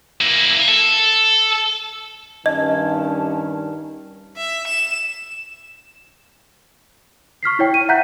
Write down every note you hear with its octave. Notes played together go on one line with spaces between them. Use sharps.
A#3 E4
A4
G2 D#3 C#4 D#5 A5
E5
E7
C#6 F6 B6 C7
E4 C#5 G5
D#7
E5 F#5 A#5 F#6 G6 B6